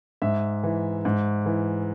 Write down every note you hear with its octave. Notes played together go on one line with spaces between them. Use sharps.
G#2 E5
E3
G#2
E3